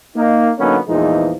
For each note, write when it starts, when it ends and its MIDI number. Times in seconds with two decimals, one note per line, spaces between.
0.16 0.50 58
0.16 0.50 63
0.59 0.78 50
0.59 0.78 54
0.59 0.78 58
0.59 0.78 59
0.59 0.78 61
0.59 0.78 63
0.88 1.34 40
0.88 1.34 46
0.88 1.34 52
0.88 1.34 53
0.88 1.34 56
0.88 1.34 63